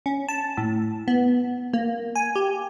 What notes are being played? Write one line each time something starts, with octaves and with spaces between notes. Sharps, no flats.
C#4
A5
A2
B3
A#3
G#5
G4